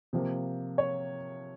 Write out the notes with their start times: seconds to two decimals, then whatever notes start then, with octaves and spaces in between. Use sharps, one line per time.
0.13 C3 F3 A#3
0.78 C#5